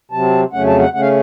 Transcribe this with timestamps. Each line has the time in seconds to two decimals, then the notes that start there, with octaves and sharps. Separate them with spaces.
0.11 C3 F#3 C4 A5
0.53 F2 C#3 F#3 A3 C#4 F#5
0.67 A5
0.80 F#5
0.94 C#3 A3 C#4 F#5
1.01 F5